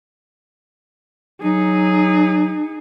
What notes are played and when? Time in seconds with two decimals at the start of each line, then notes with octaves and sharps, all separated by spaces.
1.43 F#3 D#4 G#4